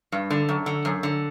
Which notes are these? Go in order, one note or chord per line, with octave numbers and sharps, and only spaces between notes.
G2
D3
F#2
D3
F#2
D3